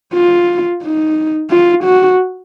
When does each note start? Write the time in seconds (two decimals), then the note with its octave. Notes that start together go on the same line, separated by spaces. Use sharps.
0.14 F4
0.83 D#4
1.50 F4
1.84 F#4